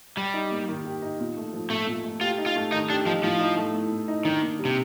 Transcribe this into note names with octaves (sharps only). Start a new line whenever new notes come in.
G3 G4
D#4
A#3
D#3
G4
D#4
A#2
A3
F3
A#2 A3
A#2
A3
F4 G4
D#4
F4
A3
D#3 D#4
D4 G4
F3 D#4
A2 F3
D#4
A3
A2
A2
D#4
D#3 D4
A#3
G3
C3